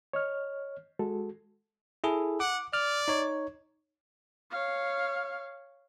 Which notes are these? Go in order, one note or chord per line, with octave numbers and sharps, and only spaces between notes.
C#5 D#5 F6
G#3 F#4 A4
E4 G#4 A4
F#5 D6
D5 F6
D#4 C#5
C#5 F5